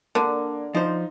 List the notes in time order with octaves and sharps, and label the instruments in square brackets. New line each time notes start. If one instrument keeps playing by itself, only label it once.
[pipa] D3 [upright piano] A#3 D4
[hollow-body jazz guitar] F3 C5 [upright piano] D#4